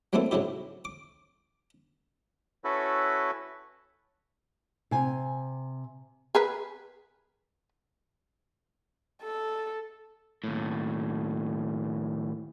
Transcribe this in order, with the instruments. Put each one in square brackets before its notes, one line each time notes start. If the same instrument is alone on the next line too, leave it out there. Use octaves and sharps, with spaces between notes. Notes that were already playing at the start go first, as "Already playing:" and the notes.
[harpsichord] F#3 G3 A3 A#3 C4 E4
G#2 C#3 F#3 E4 G4
D6
[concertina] C#4 E4 F#4 A4 B4
[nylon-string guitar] C3 G#5
[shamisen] G#4 A#4 B4
[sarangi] A4
[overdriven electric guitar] D#2 A2